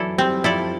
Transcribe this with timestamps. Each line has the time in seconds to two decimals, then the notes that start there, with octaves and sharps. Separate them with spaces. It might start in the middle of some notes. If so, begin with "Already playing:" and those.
Already playing: E3 F#3 E4 A4 D5
0.18 G3 C4
0.44 F3 E4 A4 D5